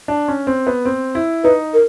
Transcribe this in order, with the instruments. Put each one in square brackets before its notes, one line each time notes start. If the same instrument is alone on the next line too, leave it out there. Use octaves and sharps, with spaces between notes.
[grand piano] D4
C#4
C4
B3
C4
E4
[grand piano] D#4 [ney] B4
[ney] A#4